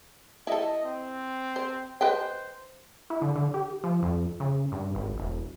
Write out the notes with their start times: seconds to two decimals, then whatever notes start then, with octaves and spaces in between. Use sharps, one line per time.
0.47 E4 A4 D#5
0.83 C4
1.56 C5
2.01 B4 C5 D#5 G5
3.10 E4
3.22 D3
3.36 D3
3.54 G4
3.84 F3
4.03 F2
4.40 C#3
4.72 G2
4.95 G#1
5.18 E1